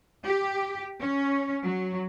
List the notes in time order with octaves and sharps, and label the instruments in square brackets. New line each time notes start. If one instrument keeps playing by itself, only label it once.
[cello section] G4
C#4
F#3